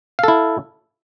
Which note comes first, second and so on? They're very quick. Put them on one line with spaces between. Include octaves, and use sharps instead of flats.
F5 A4 E4